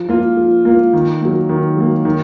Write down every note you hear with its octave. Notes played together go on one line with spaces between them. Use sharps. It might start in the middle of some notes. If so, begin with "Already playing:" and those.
Already playing: F3
A#3 F4
F3
A#3 F4
D#3
F#3 A#3
D#3
F#3 A#3
D#3